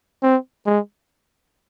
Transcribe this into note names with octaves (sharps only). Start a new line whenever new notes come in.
C4
G#3